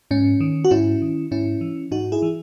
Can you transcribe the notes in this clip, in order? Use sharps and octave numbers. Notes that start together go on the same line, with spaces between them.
G#2 C#4
D#3
F#4
G#2 C#4 E4
D#3
G#2 C#4 E4
E3
G#2 D#4 F#4
E4 G#4
E3